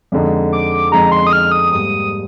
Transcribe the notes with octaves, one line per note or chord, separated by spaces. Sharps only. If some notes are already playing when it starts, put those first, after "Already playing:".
F2 D3 G#3 D#4
D6
F2 D3 G#3 D#4 A#5
C6
D#6
F6
D#6
G#2 G3 A#3 D#6